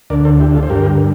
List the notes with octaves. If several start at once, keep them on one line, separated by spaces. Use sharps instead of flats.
D2 D3 A#4 D5
A4 C5
E4 G4
F4 A4
C5
G2 D3 G4 A#4